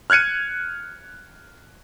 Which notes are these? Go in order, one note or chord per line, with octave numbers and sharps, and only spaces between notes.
F6 F#6 G#6 C#7 D#7